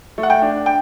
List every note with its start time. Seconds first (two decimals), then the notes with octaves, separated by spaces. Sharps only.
0.18 A3
0.23 F#5
0.30 G5
0.42 D4
0.66 G5